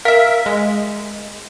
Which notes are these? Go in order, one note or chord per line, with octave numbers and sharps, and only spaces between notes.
A#4 E5 F5
G#3